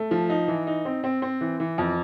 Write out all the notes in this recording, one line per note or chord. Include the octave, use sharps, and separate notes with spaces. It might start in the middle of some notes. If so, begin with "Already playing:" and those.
Already playing: A3
F3
D#4
E3
D#4
C4
C4
C4
E3
E3
F2